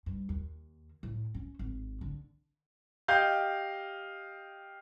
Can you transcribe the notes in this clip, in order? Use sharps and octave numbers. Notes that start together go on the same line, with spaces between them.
G2
D#2
A2
C#4
G#1
D3
G4 D#5 F5 G5 G6